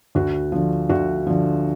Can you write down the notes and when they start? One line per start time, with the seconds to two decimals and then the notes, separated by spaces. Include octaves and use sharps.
0.15 D2 F#4
0.52 D3 F3
0.89 D2 F#4
1.27 D3 F3